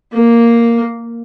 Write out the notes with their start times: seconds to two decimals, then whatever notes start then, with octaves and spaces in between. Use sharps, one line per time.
0.13 A#3